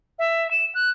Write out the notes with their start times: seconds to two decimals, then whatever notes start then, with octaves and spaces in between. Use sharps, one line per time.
0.19 E5
0.51 E7
0.75 F#6